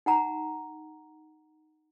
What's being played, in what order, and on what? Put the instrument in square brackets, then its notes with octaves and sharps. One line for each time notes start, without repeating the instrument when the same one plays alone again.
[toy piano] D#4 F#5 A#5